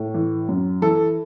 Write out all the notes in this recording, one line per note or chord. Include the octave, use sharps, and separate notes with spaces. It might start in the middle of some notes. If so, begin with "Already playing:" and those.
Already playing: A2
E3
F#2
E3 A4